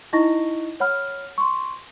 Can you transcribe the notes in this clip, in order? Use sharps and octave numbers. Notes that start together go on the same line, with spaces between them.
D#4 E4 D#5 C#6 A#6
C#5 F#5 B5 F6
C6 C#6